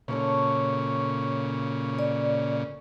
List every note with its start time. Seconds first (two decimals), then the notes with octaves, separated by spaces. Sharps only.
0.08 A#2 C#3 A4 C#5 C#6
1.99 D5